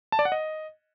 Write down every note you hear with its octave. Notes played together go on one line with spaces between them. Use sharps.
A5
D5
F#5
D#5